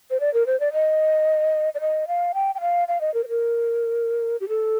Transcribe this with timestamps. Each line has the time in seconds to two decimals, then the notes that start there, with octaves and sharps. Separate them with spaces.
0.10 C5
0.20 D5
0.34 A#4
0.46 C5
0.60 D5
0.73 D#5
1.75 D5
1.81 D#5
2.08 F5
2.34 G5
2.55 G5
2.61 F5
2.88 F5
3.01 D#5
3.14 A#4
3.24 C5
3.28 A#4
4.40 G4
4.49 A4